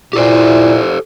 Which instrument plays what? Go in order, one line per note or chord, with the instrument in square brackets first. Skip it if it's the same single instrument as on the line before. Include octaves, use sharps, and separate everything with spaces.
[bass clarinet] A#2 [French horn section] E4 [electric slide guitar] G4 A4 C5